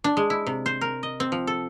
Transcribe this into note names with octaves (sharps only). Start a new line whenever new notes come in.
D4
G#3
E4
C3
C5
A#4
D#5
C4
F3
A4